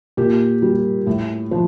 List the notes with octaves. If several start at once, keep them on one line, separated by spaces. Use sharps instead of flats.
A#2 G4
G3
A2
F3